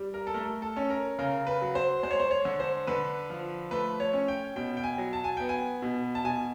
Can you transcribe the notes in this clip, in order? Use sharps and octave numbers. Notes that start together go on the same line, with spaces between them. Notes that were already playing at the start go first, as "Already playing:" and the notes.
Already playing: G3
A#4
A4
A3 A#4
A4
C#4
A#4
C#3 A#4
B4
F#3
C5
G#3 C5
C#5
C5
C#5
D3
C5
D3 B4
F3
A3 B4
C#5
C#4
G5
B2 G5
G5
G#5
F#3
A5
G#5
B3 G5
G#5
B2
A5
B2 G#5